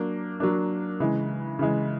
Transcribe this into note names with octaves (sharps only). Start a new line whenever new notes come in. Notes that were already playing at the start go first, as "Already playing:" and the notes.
Already playing: F#3 A#3 D4
F#3 A#3 D4
C#3 E3 G#3
C#3 E3 G#3